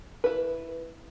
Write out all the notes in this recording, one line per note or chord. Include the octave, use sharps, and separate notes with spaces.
E4 B4